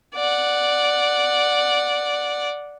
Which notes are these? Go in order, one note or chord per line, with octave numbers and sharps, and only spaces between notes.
D5 F#5